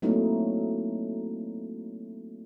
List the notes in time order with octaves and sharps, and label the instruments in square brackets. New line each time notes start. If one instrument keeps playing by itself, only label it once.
[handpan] F#3 A3 A#3 C4 D#4 E4